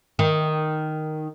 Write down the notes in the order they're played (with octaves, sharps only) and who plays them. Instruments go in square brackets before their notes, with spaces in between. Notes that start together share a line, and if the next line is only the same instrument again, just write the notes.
[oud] D#3